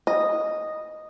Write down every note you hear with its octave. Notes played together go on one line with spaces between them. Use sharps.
D#5